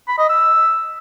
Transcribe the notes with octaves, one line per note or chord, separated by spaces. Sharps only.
B5
D#5
E6